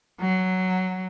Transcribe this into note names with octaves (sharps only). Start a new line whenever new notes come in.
F#3